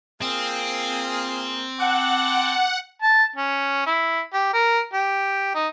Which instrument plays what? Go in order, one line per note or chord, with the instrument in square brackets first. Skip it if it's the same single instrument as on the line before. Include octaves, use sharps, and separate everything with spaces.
[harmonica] A#3 F4 G#4 [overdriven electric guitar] C4
[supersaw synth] F#5 [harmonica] G5 A5 D6
[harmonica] A5
C#4
E4
G4
A#4
G4
D#4